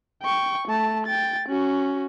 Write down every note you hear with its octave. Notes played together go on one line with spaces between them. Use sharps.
G5 C#6
A3 A5
G5 A6
C#4 F#4